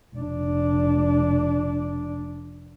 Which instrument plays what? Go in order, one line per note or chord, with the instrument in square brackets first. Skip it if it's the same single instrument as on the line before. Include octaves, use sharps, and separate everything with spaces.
[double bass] F1 D4